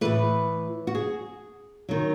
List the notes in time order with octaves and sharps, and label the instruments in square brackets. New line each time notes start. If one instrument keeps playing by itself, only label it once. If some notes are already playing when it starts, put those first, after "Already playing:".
[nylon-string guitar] A2 E3 B4
F#4
G#4
D#3 F#3